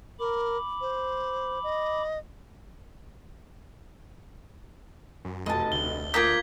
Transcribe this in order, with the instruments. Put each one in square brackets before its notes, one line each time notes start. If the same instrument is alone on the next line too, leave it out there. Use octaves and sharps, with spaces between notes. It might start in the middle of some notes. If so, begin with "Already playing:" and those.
[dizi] A#4 [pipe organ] B5 D6
[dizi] C5
D#5
[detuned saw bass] F#2
[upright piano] F1 B1 [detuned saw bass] F2 [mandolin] D#5 A5
[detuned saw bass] D2 [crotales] G7
[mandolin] A#3 A#5 G6 [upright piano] F4 A#4 D#6 [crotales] G#6 B6